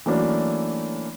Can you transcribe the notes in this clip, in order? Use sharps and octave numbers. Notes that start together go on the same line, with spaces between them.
E3 F#3 A3 A#3 C#4 D4